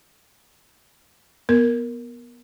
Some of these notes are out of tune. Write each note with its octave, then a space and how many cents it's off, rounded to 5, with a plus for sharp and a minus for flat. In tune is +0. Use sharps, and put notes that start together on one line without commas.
B3 -20 A#4 +0